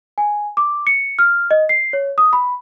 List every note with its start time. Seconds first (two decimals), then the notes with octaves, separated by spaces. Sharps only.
0.18 G#5
0.57 D6
0.87 C#7
1.19 F6
1.51 D#5
1.69 C7
1.93 C#5
2.18 D#6
2.33 B5